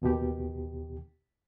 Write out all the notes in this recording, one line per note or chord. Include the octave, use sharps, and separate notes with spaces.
D#2 B2 D#3 G4